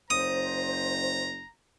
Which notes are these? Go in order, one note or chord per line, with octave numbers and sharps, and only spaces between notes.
F#1 C5 A#5 D#6